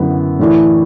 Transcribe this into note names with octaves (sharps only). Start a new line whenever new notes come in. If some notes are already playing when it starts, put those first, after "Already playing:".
Already playing: F#2 D3 B3 E4
A2 E3 D4